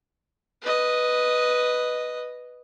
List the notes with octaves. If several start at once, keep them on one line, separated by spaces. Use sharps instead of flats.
B4 D#5